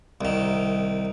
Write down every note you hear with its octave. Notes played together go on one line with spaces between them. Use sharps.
C2 D#3